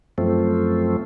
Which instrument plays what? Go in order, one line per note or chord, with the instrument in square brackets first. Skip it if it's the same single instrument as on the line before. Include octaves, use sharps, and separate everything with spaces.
[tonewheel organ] F#2 F3 A3 C4